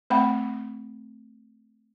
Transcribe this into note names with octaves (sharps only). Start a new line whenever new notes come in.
A3 C4 F#5 B5